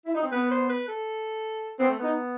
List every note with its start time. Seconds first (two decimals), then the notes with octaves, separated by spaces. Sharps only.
0.06 E4
0.15 D#4
0.23 C4
0.32 B3 B4
0.51 C5
0.69 B4
0.88 A4
1.79 B3 C4
1.88 A3
1.99 B3 D#4